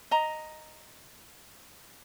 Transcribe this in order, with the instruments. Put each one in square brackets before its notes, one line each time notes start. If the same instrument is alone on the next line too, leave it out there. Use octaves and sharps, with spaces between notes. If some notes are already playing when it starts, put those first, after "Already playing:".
[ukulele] D#5 A#5